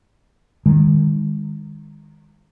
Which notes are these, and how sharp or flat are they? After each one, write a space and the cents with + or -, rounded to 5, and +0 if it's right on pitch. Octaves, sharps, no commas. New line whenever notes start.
D#3 -10 G#3 -30